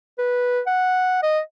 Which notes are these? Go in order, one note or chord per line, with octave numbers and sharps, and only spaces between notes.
B4
F#5
D#5